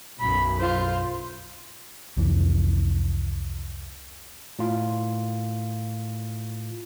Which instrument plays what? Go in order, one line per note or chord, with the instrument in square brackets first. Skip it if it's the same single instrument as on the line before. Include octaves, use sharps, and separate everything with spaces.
[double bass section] B1 F#2 [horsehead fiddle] B5
[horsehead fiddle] F4 C5
[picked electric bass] C2 F2 E3
[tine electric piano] A2 F4